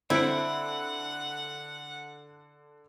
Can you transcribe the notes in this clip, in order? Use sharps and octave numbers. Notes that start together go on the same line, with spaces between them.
D3 C4 E4 F#5 D7